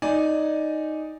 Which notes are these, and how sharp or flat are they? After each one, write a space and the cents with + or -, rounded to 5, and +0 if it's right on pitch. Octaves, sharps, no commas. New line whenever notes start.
D#4 +0 D5 +0 G#5 +0